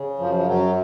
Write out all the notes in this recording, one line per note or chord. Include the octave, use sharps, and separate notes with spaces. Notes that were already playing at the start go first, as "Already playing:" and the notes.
Already playing: C#3
F#2 F3
F3
F#2 F#3